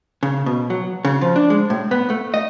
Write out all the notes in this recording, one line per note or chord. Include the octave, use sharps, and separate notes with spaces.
C#3
B2
F#3
C#3
F3
D4
G#3
A2
B3
A3
D#5